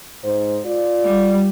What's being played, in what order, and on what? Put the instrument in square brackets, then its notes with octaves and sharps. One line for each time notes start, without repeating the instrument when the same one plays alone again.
[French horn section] G#2 C5
F4 D5
[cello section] G3